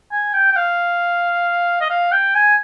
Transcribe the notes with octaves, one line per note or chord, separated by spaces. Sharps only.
G#5
G5
G5
F5
D#5
F5
G5
G#5